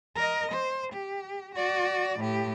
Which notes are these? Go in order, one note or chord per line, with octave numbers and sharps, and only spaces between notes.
A#4 D#5
C5
G4
F#4 D5
A2 G4